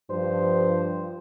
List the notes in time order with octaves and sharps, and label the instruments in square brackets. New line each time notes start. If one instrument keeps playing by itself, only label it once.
[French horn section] G2 F3 [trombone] C5